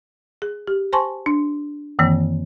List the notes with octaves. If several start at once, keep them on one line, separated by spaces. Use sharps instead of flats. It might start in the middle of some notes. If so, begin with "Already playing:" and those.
G#4
G4
C5 G#5 A5 C6 C#6
D4
F#2 D#3 E3 A#3 C4